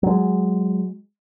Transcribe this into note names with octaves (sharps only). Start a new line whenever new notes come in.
F#3 G#3